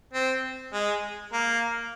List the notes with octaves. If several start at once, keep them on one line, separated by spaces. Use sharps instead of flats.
C4
G#3
A#3